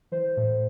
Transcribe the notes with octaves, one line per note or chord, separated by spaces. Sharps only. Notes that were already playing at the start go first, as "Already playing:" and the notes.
E3 C5
A2